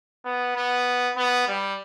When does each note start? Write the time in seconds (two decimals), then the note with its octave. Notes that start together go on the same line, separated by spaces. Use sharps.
0.25 B3
0.56 B3
1.16 B3
1.48 G3